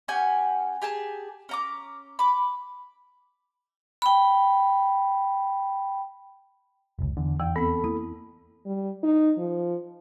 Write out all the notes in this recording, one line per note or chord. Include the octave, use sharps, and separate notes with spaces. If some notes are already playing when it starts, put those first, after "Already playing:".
C#4 G4 F#5 G#5
G4 G#4 G#5 A5
C#4 A#5 D6
B5 D6
G5 B5
F1 C#2
E2 D3
F2 E3 G5
B3 C4 A4 B5
A#3 E4
G3
D#4
F3